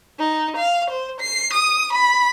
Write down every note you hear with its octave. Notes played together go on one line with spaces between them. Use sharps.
D#4
F5
C5
C7
D#6
B5